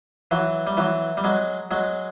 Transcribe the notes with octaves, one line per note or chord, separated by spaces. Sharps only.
E3 F#3
G3
E3 F#3
G3
F#3 G#3
F#3 G#3